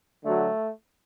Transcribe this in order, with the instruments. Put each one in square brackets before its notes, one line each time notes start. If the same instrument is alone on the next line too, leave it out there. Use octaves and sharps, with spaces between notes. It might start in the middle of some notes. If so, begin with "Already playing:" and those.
[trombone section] D2 D3 F#3 A3